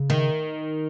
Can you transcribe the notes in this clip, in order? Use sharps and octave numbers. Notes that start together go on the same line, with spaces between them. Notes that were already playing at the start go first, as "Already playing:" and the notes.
Already playing: C#3
D#3